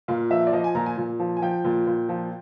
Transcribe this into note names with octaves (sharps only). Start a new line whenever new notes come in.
A#2 F5
F3 E5
D5
F3 D#5
G#5
A#2 A#5
G#5
A#2
F3
G#5
F3 G5
A#2
A#2
F3